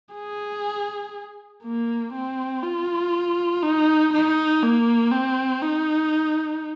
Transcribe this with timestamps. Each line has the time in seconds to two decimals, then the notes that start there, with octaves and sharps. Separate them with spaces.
0.14 G#4
1.64 A#3
2.13 C4
2.63 F4
3.63 D#4
4.13 D#4
4.63 A#3
5.12 C4
5.62 D#4